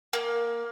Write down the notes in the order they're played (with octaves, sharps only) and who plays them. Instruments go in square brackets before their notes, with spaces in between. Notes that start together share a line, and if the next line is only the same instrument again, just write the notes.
[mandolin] A#3